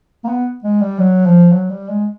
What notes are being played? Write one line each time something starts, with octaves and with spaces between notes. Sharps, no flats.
A#3
B3
G#3
G3
F#3
F3
F#3
G3
G#3